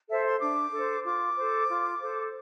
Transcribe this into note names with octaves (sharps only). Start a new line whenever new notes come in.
A4 C5 E5
C6
D4 D6
A4 C5
F4 D6
A4 C5
F4
A4 C5